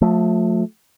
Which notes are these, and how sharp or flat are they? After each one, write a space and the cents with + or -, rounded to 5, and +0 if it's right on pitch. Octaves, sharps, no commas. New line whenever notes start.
F3 +40 A3 +0